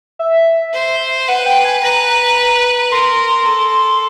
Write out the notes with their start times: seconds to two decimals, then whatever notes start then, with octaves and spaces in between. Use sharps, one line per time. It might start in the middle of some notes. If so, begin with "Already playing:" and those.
0.19 E5
0.74 C5
1.28 B4 F#5
1.40 F#5
1.46 G5
1.64 G#5
1.83 B4 A#5
2.91 A#4 C6
3.46 A4